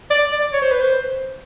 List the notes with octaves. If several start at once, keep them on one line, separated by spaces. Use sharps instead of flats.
D5
D5
C#5
C5
B4
C5